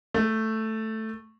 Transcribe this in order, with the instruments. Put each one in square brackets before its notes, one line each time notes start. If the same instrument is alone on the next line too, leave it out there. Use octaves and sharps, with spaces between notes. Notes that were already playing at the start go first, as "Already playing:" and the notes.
[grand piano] A3